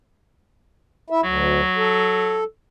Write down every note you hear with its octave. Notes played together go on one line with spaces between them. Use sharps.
E4 E5
D2 F#3
A4